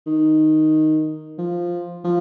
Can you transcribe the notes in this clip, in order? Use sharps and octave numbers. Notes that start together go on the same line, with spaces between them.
D#3
F3
F3